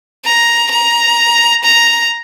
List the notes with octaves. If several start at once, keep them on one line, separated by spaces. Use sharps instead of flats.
A#5
A#5
A#5